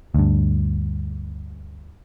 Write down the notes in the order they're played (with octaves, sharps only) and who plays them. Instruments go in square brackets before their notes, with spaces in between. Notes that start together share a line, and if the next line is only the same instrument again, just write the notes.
[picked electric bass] D2 G2